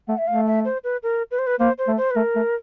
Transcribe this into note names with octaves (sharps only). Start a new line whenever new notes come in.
A3 F#5
E5
A3 F5
E5
C5
B4
A#4
B4
C5
B4
A#3 C5
C5
A3
C5
B4
A3 A#4
A3